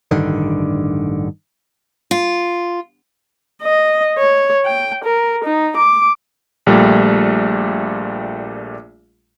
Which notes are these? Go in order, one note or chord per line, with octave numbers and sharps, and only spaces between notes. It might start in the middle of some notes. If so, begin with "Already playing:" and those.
A1 G2 D3 D#3
F4
D#5
C#5
G5
A#4
D#4
D6
A#1 A#2 G3 A3